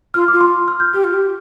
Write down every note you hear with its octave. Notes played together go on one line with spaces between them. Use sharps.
F4 F6
F4 D6
C6
F6
G6
G4 F6
F4
G4